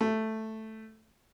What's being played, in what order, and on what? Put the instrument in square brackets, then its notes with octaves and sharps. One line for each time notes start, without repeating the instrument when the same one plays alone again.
[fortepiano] A3